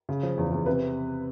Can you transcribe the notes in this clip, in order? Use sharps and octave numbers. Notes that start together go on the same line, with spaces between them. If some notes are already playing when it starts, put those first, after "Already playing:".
C#3
F3
E2
E2
C3 B4